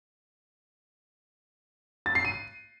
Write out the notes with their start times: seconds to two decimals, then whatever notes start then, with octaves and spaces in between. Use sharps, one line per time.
2.06 A6
2.15 C7
2.25 D#7